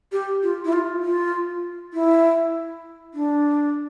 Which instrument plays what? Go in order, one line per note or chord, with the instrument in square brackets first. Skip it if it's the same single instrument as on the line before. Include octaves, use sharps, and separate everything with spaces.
[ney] G4
F4
E4
F4
F4
E4
D4